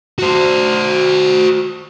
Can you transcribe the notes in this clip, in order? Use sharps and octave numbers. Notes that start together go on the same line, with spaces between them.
F#4 C5